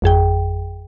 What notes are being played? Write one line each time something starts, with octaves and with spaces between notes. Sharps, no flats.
G#1 F2 G#4 G5